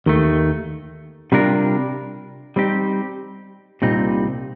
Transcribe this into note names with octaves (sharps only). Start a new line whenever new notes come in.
D#2 D#3 A3
C3 G3 D4 F4 A#4
G3 C4 D#4 G4
C2 A#2 G3 C4 D#4